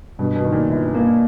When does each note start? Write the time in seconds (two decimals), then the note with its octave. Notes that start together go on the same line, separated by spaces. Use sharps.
0.19 G2 B2
0.36 B2
0.44 D#3
0.52 A#2
0.70 G1
0.94 A#3